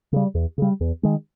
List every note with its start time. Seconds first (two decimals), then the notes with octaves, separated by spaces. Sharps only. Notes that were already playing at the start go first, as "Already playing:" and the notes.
0.13 C#3 G3
0.35 E2
0.58 C#3 G3
0.81 E2
1.03 D#3 G#3